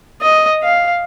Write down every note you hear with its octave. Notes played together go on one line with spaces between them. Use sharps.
D#5
F5